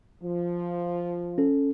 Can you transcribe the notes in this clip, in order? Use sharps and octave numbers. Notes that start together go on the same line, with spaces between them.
F3
C#4 A4